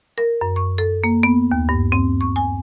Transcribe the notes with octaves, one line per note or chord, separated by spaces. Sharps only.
A#4
F#2
C#6
A4
A#3
B3
D#2
G2
C4
C#6
G#5